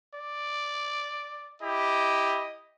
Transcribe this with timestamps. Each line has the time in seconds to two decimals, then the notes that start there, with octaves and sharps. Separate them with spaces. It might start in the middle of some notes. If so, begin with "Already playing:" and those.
0.14 D5
1.61 E4 G4 D#5